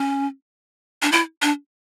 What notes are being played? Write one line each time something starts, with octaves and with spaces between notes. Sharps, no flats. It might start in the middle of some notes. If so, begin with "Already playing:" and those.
Already playing: C#4
D4
E4
D4